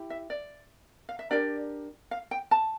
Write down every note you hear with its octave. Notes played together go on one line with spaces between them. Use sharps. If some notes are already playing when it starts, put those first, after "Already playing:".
Already playing: E4 G4
E5
D5
F5
E5
D4 G4 A#4 D5
F5
G5
A5